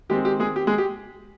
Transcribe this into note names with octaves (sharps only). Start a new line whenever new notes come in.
D#3 G#3 C4 G4
G4
G#3 G#4
G4
G#3 G#4
G4